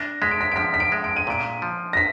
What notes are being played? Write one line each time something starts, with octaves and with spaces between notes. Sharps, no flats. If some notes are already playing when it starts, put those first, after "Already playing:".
Already playing: D4 A#6
G#3 B6
D7
B6
D7
F3 B6
B6
D7
G#3
D7
D#7
A#2 D7
F3
A#6
B6